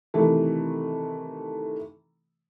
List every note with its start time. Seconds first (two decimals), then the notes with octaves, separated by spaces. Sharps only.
0.14 C3 D#3 E3 A3